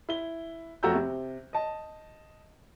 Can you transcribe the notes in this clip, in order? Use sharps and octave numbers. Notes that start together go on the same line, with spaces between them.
E4 G7
F2 A3 F#4 A#5 E6 G6
C3
D#5 A5